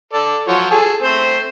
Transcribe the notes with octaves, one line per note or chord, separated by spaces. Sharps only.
A4 D5
F3 F#3 C#5
G#4 A4
A3 C4 C5